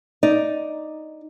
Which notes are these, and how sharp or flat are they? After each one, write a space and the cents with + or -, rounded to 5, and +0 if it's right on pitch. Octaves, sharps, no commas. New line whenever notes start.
D#4 +0 D5 +0